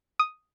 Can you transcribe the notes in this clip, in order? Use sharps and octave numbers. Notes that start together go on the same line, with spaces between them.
D#6